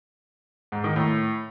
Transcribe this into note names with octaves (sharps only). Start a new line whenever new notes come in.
G#2
D#3
A2